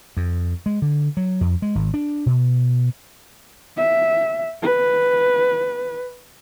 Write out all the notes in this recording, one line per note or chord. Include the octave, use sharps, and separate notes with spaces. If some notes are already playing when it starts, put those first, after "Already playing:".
F2
G#3
D3
F#3
F2
G#3
G#1
D4
B2
E5
B4